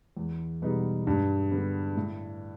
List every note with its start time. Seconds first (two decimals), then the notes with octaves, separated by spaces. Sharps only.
0.17 E2
0.62 B2 G3 B3 D#4
1.07 G2
1.51 D3 G3 B3
1.96 A2